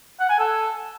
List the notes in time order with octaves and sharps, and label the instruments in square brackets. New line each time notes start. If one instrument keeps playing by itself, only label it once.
[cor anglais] F#5
G#5
A4